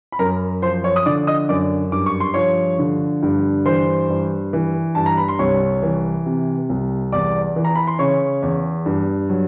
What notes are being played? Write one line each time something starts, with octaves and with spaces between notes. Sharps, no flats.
B5
F#2 A#4 A#5
F3 C5 C6
C#5 C#6
D#6
D3 D5 D6
D#5 D#6
F#2 D5 D6
G2 D6
C#6
C6
F3 C#5 C#6
D3
G2
E3 C5 C6
G2
E3
G2 A5
A#5
B5
C6
C2 C#5 C#6
E3
C3
C2
E2 D5 D6
E3
A#5
B5
C6
C#3 C#5 C#6
E2
G2
F#3